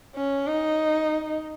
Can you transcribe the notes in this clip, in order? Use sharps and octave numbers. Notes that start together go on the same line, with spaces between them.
C#4
D#4